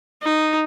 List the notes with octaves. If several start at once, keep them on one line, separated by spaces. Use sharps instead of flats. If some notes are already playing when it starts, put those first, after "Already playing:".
D#4